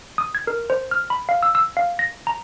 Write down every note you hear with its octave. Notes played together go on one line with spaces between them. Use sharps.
D#6
G#6
A#4
C5
F6
B5
F5
E6
E6
F5
A#6
A#5